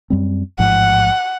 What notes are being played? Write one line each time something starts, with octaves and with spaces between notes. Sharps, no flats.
F#2 G3 C4
A1 G#2 F3 F#5